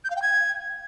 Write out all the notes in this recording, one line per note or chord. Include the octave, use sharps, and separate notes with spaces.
G6
F5
G5
G#6